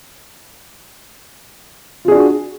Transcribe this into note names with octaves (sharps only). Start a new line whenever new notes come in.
D4 F4 F#4 G#4